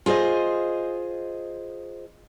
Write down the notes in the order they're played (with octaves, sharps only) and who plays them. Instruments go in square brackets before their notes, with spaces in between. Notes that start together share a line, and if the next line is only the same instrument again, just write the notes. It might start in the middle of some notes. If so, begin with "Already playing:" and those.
[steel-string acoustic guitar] F4 G#4 C5 D#5